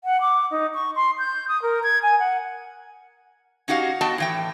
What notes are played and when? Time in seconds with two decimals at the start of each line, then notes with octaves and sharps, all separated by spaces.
0.04 F#5
0.21 D6
0.51 D#4
0.74 C#6
0.95 C6
1.19 G6
1.48 D#6
1.62 A#4
1.83 G#6
2.02 G#5
2.19 F#5
3.68 C#4 D#4 F#4 G4 F5
4.01 B3 F#4 D#5 G5 A5
4.18 A2 E3 G5